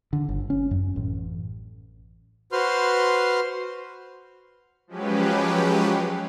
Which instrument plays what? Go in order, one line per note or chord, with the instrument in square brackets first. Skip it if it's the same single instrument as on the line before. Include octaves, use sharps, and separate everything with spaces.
[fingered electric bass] D3
G1
C#4
F#2
A1
[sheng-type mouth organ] F#4 B4 C5 C6 F6
[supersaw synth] F3 F#3 G#3 C#4 G4 B4